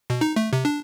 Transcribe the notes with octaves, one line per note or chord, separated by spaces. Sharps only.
B2
D#4
A3
C3
D4